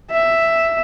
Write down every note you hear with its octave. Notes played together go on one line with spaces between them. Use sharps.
E5